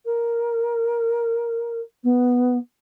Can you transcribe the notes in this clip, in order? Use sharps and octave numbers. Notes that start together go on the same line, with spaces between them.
A#4
B3